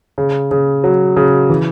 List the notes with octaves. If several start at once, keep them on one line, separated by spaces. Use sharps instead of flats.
C#3
C#3
F#3
C#3
E3